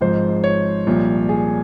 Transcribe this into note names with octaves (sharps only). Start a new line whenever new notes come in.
G#1 G#2 F3 C5
C#5
C2 A#2 F3
G#4